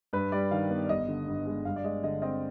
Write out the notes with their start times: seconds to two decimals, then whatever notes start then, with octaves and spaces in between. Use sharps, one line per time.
0.13 G2 B4
0.32 G3 D5
0.51 D#3 F5
0.70 B3
0.83 D5
0.89 G1 D#5
1.08 D3
1.27 G2
1.46 G#3
1.65 G2 F5
1.76 D5
1.84 G#3 D#5
2.03 D3 D#5
2.22 C4 D#5